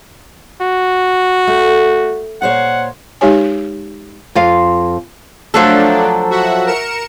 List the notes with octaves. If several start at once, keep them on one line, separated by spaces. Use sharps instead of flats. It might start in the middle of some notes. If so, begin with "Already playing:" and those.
F#4
A3
A#2 C5 C#5 F#5
G#3 D#4 G4 C#5 G#5
F2 F4 F5
F3 F#3 A3 D4 A4
F#4 E5 F#5
A#4 C#7 E7